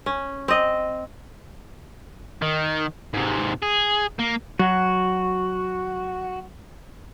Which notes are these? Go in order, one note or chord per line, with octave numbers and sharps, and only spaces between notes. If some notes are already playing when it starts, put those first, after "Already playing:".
C#4
C4 D#5
D#3
G#2 C3
G#4
A#3
F#3 F#4